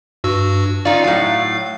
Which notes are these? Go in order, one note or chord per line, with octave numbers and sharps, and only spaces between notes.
G2 F#4 E6
C#4 D#4 F4 D5
A2 F#3 F5